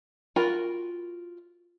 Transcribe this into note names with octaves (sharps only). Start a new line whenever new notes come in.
F4 F#4 A#4 G5 B5